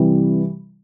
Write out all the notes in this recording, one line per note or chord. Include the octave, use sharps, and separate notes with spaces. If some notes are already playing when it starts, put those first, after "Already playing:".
Already playing: C3 E3 G3